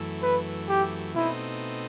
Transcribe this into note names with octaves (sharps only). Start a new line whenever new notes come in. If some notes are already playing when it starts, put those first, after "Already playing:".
Already playing: F#2 E3 A3
B4
G4
B2 A3 C4 D#4 E4